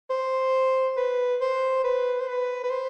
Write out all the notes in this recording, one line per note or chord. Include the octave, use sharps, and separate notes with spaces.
C5
B4
C5
B4
C5
B4
B4
C5